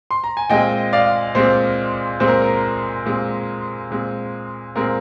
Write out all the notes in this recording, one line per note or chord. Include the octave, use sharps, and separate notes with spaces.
C6
A#5
G#5
A#2 G#3 C4 D#5 G5
D5 F5
A#2 G#3 C4 C5
A#2 G#3 C4 C5
A#4
A#4
A#2 G#3 C4
A#2 G#3 C4
A#2 G#3 C4 A#4